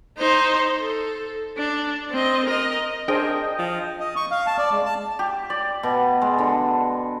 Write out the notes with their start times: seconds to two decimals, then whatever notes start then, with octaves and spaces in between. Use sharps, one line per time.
0.17 D#4 C5
0.78 A4
1.57 D4
2.11 C4 D#5
2.45 A#4 D#5
3.08 D4 G#4 A#4 C5 D#5 G5
3.59 F3
4.00 D#5
4.16 C#6
4.31 F5
4.46 A5
4.58 D5
4.72 G#3
4.85 A5
5.19 G4
5.50 D5
5.83 B2
6.21 G#3
6.38 D3